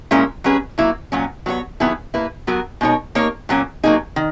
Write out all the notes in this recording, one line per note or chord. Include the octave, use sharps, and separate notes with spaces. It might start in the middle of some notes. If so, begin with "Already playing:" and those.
A#2 G#3 C#4 E4 A#4
F#3 C#4 G#4 B4
F#3 A#3 E4
A#2 F#3 C#4
F#3 B3 F#4 C#5
D#3 F#3 B3 E4 G#4
A#3 E4 B4
F#3 B3 F#4 A#4
B2 G#3 D#4 A#4 C#5
A#3 D#4 A#4 C#5
A#2 F#3 A#3 C#4
F#3 A#3 D#4 G#4
D#3